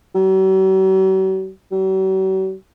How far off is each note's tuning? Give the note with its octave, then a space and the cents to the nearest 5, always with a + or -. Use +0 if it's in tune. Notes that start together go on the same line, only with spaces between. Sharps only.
F#3 +45
F#3 +45